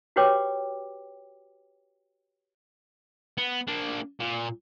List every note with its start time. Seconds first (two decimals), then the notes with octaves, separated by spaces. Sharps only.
0.16 F#4 G4 B4 C#5 G5 D6
3.38 B3
3.67 A#3 D4
4.20 A#2